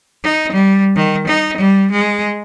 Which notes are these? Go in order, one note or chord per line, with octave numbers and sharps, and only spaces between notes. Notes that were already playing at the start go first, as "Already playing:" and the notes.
D#4
G3
D#3
D#4
G3
G#3